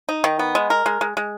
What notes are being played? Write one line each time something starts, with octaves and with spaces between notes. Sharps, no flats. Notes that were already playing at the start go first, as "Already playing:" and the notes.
D#4
D#3
B3
G#3
A#4
G#3
G#3
G#3